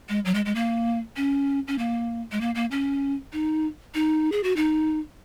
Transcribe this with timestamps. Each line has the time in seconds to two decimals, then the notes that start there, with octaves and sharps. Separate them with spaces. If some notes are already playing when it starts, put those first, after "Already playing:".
0.09 G#3
0.25 F#3
0.35 G#3
0.45 G#3
0.55 A#3
1.17 C#4
1.68 C#4
1.78 A#3
2.32 G#3
2.41 A#3
2.55 A#3
2.71 C#4
3.33 D#4
3.95 D#4
4.32 G#4
4.43 F#4
4.56 D#4